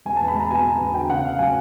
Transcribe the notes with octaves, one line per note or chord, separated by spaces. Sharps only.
E1 G#5
E2 A5
B5
G#3 A#5
B2 G#5
E1
E2
D2 G5
C#3 F#5
A3 F5
F#3 G#5